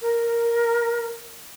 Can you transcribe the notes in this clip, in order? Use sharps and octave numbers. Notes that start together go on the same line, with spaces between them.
A#4